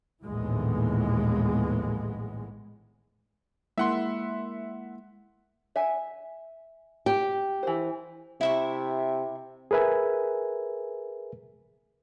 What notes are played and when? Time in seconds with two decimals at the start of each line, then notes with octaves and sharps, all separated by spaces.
0.25 A#1 D#2 A2 E3 G#3 B3
3.78 G#3 A#3 E4 E5 F#5 C6
5.76 E5 G#5
7.06 G4
7.63 E3 C5
8.41 C3 E4 E5 C#6
9.71 G#4 A#4 B4 E5 G#5